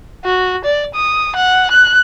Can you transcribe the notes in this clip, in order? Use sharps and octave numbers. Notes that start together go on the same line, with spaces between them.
F#4
D5
D#6
F#5
F#6